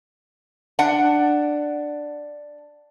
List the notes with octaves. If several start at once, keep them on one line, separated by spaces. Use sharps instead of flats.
D4 F#5